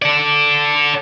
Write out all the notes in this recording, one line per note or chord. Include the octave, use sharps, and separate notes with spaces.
A4 D5